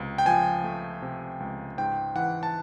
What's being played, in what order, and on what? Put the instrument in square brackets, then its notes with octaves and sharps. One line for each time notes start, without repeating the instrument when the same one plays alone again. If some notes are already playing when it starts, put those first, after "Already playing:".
Already playing: [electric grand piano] C#2 C3
G5
F3 G#5
A3
C3
C#2
G#2 G5
E3 F#5
A5